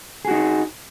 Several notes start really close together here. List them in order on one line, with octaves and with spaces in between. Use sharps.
G#4 F#4 D#4